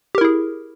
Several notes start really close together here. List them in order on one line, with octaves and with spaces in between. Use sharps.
G4 A#4 E4 G#4